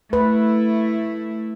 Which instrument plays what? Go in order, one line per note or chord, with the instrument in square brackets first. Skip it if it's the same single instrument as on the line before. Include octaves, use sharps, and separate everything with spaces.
[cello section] A3 E4 [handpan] B4